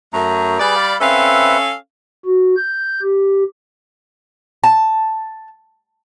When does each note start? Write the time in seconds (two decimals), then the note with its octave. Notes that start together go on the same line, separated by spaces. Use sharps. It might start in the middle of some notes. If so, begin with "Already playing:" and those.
0.13 F#2 A3 A#5
0.60 G3 G#4 B4 D5
0.76 F5 B5
1.01 C4 C#4 A4 B4 E5 F5
2.25 F#4
2.57 G6
3.02 G4
4.64 A5